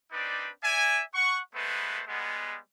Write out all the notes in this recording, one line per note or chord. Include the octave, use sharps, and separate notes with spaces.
C4 D4 D#4 B4 D5
D5 E5 G#5
F#5 C#6
G#3 A3 B3 B4 C5
G3 G#3 B3